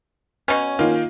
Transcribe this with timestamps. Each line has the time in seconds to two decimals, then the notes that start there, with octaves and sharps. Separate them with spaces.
0.48 B2 C#4 C#5
0.79 D#3 A#3 F4